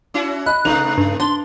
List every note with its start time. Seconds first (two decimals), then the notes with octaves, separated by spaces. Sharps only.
0.14 C#4 E4 F#4
0.46 D#5 B5 F#6
0.65 C3 A3 D#4 B4 F7
0.98 G2
1.20 D4 C6